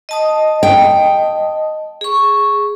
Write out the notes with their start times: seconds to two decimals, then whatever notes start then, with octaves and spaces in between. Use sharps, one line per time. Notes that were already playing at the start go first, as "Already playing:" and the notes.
0.09 D#5 A5 D#6
0.63 G5
2.01 G#4 C#6